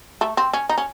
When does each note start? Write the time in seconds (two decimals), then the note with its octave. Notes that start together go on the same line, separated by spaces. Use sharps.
0.21 A3
0.37 C4
0.53 C#4
0.69 D#4
0.78 C#4